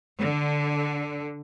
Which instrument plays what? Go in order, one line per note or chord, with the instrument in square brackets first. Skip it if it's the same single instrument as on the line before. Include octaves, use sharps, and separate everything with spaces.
[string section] D3